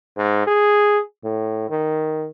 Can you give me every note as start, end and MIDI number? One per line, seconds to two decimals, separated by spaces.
0.17 0.43 44
0.47 0.99 68
1.25 1.69 45
1.70 2.27 51